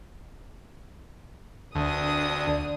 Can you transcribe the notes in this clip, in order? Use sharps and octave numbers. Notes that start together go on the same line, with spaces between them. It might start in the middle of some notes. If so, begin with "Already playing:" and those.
D2 D4 D#6